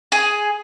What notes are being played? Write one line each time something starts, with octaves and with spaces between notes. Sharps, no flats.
G#4 G#5